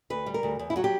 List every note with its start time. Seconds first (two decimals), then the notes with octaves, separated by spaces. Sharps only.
0.10 D2 B4
0.26 G3
0.34 A#4
0.43 D2
0.59 E2
0.70 E4
0.76 F#3 F#4
0.84 G4